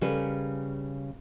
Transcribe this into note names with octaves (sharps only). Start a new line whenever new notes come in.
C#3 G3 A#4 B4